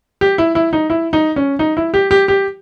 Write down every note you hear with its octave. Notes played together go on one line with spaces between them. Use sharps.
G4
E4
E4
D#4
E4
D#4
C#4
D#4
E4
G4
G4
G4